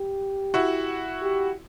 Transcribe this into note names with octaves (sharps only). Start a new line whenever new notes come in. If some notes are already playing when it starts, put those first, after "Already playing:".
Already playing: G4
E4 F#4
G4